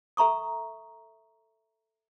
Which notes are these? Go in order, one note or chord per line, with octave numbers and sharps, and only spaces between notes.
A4 E5 A#5 C#6 D#6